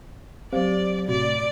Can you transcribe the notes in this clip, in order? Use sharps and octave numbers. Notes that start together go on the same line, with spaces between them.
F#3 C4 G4 C5 D5 F5
A2 C3 F#4 D5